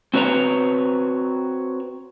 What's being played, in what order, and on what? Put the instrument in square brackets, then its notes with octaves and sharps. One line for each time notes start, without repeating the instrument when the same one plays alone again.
[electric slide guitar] C4 F#4 B4 C#5 A#5